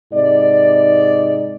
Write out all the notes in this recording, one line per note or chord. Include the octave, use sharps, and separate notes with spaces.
G#2 C3 D#4 D5